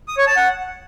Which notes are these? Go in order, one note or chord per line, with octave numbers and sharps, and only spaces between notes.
D#6
C#5
A5
F#5